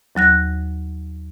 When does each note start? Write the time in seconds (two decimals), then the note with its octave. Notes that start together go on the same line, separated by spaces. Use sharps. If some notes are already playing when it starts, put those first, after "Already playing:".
0.15 D#2 F#3 F#6 A#6